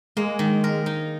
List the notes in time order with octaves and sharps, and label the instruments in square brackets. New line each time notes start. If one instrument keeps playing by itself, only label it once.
[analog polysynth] G#3 [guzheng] A#3
[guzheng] D#3
A#4
D#4